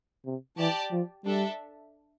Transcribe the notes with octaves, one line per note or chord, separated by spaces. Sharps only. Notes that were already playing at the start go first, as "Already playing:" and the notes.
C3
E3 G4 D5 A5
F3
G3 D4 A4 E5